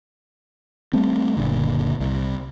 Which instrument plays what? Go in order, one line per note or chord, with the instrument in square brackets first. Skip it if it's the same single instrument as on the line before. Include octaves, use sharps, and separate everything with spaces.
[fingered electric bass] G3 A3 C4
F#1 C2 A#2 D3
C2